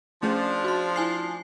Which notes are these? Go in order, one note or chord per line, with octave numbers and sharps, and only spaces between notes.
F3 A3 C#4 D4 G#4
F#4 C6
E4 G#5 C7